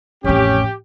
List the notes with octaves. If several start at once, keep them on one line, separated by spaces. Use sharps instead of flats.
A1 F2 C#4 G4